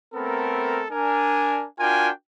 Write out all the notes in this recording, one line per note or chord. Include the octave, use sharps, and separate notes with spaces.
A3 B3 C4 A4 A#4
D4 A#4 G#5
D4 F4 F#4 A#4 G5 G#5